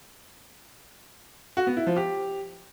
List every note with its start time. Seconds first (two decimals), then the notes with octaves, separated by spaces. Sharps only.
1.57 F#4
1.67 B3
1.77 E4
1.87 F3
1.97 G4